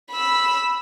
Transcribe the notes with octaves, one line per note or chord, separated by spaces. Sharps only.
B5 E6